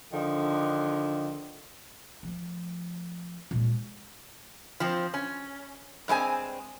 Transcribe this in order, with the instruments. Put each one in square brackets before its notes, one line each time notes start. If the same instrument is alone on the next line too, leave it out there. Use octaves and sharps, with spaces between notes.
[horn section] D3 D#3 F3
[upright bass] F3 A3
A#2 G#3
[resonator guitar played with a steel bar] F3 C4
C#4
G2 G#3 C4 G#5